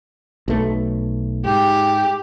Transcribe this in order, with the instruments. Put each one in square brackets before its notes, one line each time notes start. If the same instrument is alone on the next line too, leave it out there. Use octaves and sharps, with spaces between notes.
[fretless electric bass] B1 A3
[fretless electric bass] G#2 [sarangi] G4